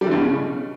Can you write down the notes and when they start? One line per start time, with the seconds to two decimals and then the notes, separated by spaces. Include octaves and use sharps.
0.01 G3
0.06 E3
0.11 G2
0.16 B2
0.21 C#3